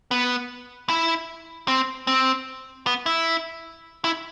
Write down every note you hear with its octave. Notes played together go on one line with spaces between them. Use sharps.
B3
E4
C4
C4
B3
E4
E4